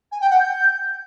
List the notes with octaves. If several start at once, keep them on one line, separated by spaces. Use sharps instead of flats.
G#5
G5
F#5
G6